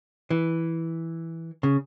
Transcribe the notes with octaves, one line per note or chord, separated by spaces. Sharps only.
E3
C#3